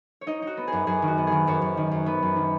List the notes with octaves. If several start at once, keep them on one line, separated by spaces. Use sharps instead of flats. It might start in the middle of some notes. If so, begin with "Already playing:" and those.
C#5
D#4 D#5
D#4
F#4
B3
G#4
F#2
F#2 G#4
D#3
F#4
B3
D#3 G#4
F#2 C#5
F#2
D#3
F#2
B3
F#2
D#3